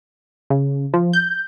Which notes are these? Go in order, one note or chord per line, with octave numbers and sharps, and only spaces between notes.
C#3
F3
G6